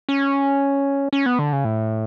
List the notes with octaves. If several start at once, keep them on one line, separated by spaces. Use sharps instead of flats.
C#4
C#4
B3
D3
C#3
A2